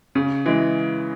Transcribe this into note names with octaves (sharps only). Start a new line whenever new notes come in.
C#3
E3 G#3